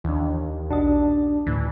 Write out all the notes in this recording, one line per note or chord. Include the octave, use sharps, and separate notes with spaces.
D#2 E3 D4
A#1 D4 F#4 D#5
D2 A2 E3